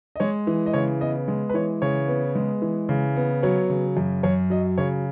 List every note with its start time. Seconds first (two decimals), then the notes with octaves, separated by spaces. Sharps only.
0.16 D#5
0.20 G#3 C#5
0.47 E3
0.66 D#5
0.74 C#3 C#5
1.01 B3 D#5
1.28 G#3
1.49 B4
1.54 E3 C#5
1.82 C#3 C#5
2.08 B3
2.35 G#3
2.62 E3
2.89 C#3
3.17 B3
3.43 F#3 C#5
3.70 C#3
3.97 F#2
4.23 F#2 C#5
4.50 F#3 D#5
4.78 C#3 C#5